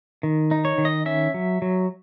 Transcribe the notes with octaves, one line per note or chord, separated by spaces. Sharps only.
D#3
D#4
C#5
D#3
D#5
C#4 E5
F#3
F#3